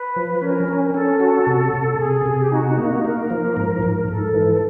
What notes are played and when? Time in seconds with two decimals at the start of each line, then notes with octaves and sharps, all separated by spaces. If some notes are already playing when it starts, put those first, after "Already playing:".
Already playing: B4
0.16 F3
0.42 C#4 A#4
0.68 C#4
0.84 A#4
0.94 C#4 A4
1.20 F#4
1.47 C3
1.73 C3
1.99 C3 G#4
2.26 C3
2.39 G4
2.51 D#4 F#4
2.77 A#3
3.04 A#3 A#4
3.30 F3
3.57 G#2
3.83 G#2
4.08 G#2 A4
4.35 E3